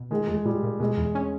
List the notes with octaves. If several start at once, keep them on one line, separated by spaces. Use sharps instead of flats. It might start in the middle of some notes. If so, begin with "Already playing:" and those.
Already playing: B2
D#3 G#3
E2 G#3
A#2 G3
A#2
B2 G#3
E2
C#4